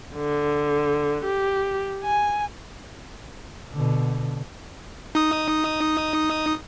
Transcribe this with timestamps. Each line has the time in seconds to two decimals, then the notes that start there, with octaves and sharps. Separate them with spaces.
0.16 D3
1.25 G4
2.04 G#5
3.74 B2 D3
5.15 D#4 D#6